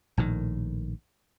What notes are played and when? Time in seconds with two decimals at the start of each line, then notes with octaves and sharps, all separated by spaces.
0.17 A#1 A2 D#3